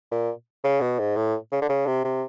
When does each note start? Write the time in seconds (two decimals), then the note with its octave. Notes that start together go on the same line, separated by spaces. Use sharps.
0.11 A#2
0.64 C#3
0.81 B2
0.99 G#2
1.16 A2
1.52 C#3
1.62 D3
1.69 C#3
1.87 C3
2.04 C3